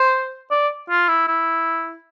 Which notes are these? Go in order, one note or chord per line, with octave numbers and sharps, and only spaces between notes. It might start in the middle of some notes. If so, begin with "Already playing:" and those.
Already playing: C5
D5
F4
E4
E4